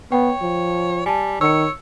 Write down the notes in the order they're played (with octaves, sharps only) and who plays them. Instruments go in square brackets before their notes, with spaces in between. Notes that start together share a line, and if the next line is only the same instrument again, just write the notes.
[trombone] B3 [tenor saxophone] C#5 [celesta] G5
[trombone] F3
[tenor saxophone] G3 [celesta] G#5 A5
[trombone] D#3 [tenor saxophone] C#5 [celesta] E6 C#7